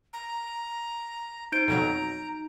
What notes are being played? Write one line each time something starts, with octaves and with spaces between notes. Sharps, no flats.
A#5
D#4 C5 G6 D7
F2 B2 F#3 A#5